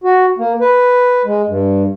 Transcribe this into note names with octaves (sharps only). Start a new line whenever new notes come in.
F#4
A#3
B4
G#3
G2